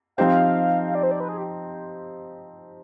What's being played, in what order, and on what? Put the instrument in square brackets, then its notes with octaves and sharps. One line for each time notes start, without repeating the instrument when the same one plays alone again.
[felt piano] F3 C4 D#4 G4 C5 [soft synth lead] F5
[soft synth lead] F5
D5
C5
D5
B4
G#4
G4